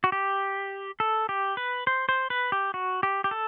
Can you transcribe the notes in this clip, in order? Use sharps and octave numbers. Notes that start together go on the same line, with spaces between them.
F#4
G4
A4
G4
B4
C5
C5
B4
G4
F#4
G4
G4
A4